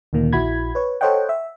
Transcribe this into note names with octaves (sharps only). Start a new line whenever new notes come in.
D2 A#2 D#3 A#3
A#1 E4 F#4 B5 G#6
B4 C#5
A4 C5 C#5 D#5 F#5 G5
E5